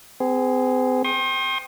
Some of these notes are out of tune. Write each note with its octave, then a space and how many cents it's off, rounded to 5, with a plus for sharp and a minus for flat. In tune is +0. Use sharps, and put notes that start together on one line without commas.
C4 -40 G#4 +0
G5 +0 C6 +40 D#6 +0